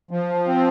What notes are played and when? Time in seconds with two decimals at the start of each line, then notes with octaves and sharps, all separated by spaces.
0.11 F3
0.47 C4